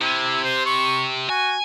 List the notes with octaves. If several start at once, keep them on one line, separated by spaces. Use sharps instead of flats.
C3 E4
C5
C#6
F#4 G#5